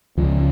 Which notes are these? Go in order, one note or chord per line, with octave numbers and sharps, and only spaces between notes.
C#2 C#3 F3